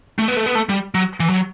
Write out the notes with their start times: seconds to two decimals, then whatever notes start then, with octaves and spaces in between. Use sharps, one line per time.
0.19 A3
0.28 B3
0.37 A3
0.46 B3
0.55 A3
0.69 G3
0.94 F#3
1.20 E3
1.29 F#3